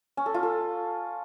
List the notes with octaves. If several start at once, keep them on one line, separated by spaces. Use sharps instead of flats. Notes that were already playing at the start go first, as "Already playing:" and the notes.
C#4
A4
F4
A4